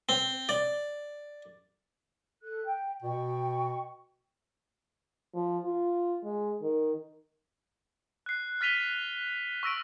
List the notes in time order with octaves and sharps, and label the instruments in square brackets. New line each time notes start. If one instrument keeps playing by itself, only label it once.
[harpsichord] C4
D5
[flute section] A4 F#6
G5
[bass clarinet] B2 [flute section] G5 C#6
[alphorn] F3
F4
G#3
D#3
[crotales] F#6 C7
F6 A6 B6 D#7 F7 G7
C#6 E6 A#6 D7